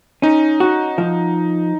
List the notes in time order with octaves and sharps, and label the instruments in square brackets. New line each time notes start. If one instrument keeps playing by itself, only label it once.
[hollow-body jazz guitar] C#4 [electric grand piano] D#4
[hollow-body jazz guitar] F#4
F3